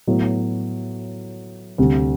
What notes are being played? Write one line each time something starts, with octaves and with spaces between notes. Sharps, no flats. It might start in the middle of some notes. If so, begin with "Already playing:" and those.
A2 F#3 B3
D2 C3 G3